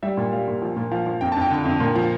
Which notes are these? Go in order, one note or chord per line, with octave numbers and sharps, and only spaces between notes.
G3 E5
A#2
G3 F5
A#2
F3
A#2
F3 F5
F3
F2 G5
A5
F2 G5
D3
F2
A#2
F3